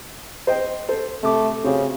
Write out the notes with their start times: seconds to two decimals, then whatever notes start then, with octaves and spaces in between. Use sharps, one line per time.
0.47 C5 D#5 G5
0.89 A4 C5
1.23 C3 A3 D6
1.64 C#3 C4 F#4 G4